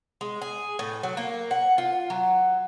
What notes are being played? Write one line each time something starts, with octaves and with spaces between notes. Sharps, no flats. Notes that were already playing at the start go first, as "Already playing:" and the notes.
G#3
G#4
A2
F#3
A#3
F#5
F4
F#3